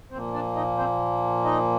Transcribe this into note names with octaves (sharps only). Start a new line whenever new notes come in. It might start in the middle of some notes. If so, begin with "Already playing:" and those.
A#2 F3 A#3 C4 C5
D4 D5
D#4 D#5
C4 C5
D#4 D#5